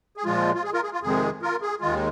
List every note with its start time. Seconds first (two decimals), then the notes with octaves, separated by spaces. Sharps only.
0.17 G#4
0.24 A#2 F3 G#3 F4
0.55 F4
0.64 G#4
0.74 F4 A#4
0.83 G#4
0.93 F4
1.02 F2 C3 D#3 G#3 G#4
1.42 F4 A#4
1.62 G#4
1.81 D#2 D#3 G#3 F4